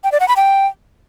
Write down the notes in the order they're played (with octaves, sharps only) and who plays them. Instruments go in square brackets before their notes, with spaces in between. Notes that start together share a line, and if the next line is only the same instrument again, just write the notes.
[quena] G5
D5
F#5
B5
G5